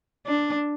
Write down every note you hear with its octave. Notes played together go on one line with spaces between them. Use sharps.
D4